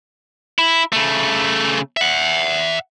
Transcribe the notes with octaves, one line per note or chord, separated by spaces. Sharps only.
E4
C#3 A3
E5 F#5